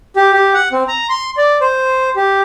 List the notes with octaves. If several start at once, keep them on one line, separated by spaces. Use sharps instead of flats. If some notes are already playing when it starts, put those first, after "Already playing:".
G4
G4
F#5
C4
A#5
C6
D5
C5
G4